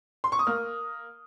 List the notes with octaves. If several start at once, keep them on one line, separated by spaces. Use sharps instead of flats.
C6
C#6
D#6
A#3 F6